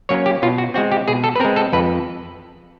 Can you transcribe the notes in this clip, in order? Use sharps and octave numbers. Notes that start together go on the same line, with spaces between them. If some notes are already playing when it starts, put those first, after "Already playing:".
F#3 A#3 C#4 C#5
G4
B2 F4
F#4
G#3 C4 F#4
G4
B2 G#4
A4
B4
G#3 C4 A#4
A4
F2 B4